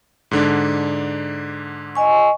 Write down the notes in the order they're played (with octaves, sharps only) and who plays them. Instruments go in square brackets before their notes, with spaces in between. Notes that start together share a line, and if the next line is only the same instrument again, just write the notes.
[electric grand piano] G#2 D3 D4
[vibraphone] D#5 G#5 C#6